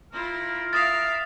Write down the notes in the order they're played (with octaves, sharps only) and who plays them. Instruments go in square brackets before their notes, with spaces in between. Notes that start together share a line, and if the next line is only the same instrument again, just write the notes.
[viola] E4 F4 [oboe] A#4
[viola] E5 F5 [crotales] D#6 F6 [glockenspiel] A6 F7